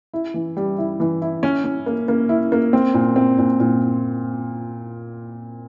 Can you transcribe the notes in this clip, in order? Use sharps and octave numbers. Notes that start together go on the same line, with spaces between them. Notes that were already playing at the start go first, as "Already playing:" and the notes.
E4
E3
G3
E4
E3
E4
C#4
C#4
A#3
A#3
E4
A#3
C4
A#2
C4
A#2
A#2